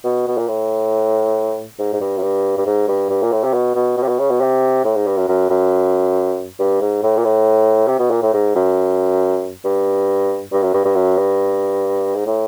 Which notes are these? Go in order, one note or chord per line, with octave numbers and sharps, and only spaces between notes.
B2
B2
A#2
A2
G#2
G#2
G2
F#2
G2
G2
G#2
G2
G2
A#2
A2
C3
B2
B2
B2
C3
B2
C#3
B2
C3
A2
G#2
G2
F#2
F#2
F#2
G2
G#2
A2
A#2
A2
C3
B2
A#2
A2
G#2
F#2
G2
G2
F#2
G2
G2
F#2
G2
G#2
A2